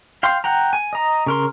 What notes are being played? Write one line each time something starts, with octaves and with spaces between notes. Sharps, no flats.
F5 G5 C6
F#5 G5 A#5
G#5
D#5 A#5
C#3 A#4 C6